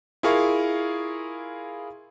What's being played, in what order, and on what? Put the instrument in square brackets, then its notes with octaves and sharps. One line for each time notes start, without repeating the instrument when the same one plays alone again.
[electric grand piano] E4 F4 G#4 A#4 F5 C#6